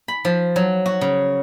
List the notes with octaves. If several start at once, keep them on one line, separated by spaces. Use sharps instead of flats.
B5
F3
F#3
F#4
C#3